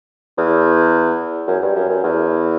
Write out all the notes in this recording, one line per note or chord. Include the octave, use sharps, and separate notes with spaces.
E2
F#2
G2
F#2
F#2
E2